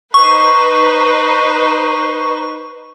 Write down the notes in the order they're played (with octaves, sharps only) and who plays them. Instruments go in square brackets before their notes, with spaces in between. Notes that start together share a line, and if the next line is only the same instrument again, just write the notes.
[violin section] D#4 B4 C5 [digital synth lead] C#6